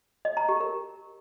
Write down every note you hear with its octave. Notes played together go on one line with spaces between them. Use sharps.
D#5
A#5
G4
A#4